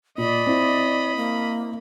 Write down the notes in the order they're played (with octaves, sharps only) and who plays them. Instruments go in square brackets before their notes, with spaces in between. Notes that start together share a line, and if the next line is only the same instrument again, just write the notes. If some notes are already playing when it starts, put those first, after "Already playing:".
[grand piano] A#2 [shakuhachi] D5 [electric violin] D#5 B5
[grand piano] C4 E4
[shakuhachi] A#3